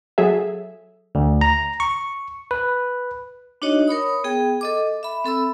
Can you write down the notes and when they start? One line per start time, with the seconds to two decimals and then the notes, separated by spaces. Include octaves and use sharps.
0.18 F#3 G#4 A4 E5
1.15 D2
1.41 A#5
1.80 C#6
2.51 B4
3.62 D4 D#4 F#4 C#5 D#5
3.88 A#4 C#5 B5 D#6
4.24 B3 G#4 G5
4.61 A4 D#5 D6
5.03 E5 B5
5.24 C4 A4 B5 E6